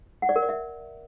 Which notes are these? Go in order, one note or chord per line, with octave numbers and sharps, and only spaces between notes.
F#5
D5
A#4
D5
E5